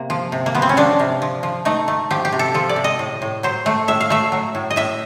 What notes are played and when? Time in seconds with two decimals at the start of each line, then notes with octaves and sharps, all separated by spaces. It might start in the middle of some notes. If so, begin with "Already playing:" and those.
Already playing: C3 A#3
0.10 F3
0.32 C3
0.46 A#3
0.55 F3 B3
0.62 C4
0.69 C#4
0.77 F3 D4
0.99 C3
1.22 F3
1.43 F3
1.65 A3 D#4
1.88 A3
2.11 F3 G4
2.25 G4
2.32 C3
2.39 A4
2.54 F3 A4
2.69 D5
2.76 C3
2.84 D#5
2.99 A2
3.22 A2
3.43 F#3 C5
3.66 A3
3.88 A2 E5
4.01 F5
4.10 A3 E5
4.32 F#3
4.55 A2
4.71 D#5
4.76 A2 E5